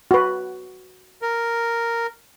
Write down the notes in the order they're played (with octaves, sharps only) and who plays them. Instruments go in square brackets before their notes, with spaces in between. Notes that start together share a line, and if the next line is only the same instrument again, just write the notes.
[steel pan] F#4 B4
[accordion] A#4